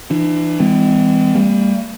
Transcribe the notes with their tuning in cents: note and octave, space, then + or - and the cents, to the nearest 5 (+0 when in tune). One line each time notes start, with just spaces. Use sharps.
E3 +30 D4 +45
E3 +0 G#3 -35 C4 -40
G3 +20 A#3 -35